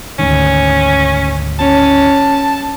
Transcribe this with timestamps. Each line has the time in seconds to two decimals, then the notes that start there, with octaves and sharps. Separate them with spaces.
0.19 D2 G#2 D#3 C#4
1.59 C#4 A5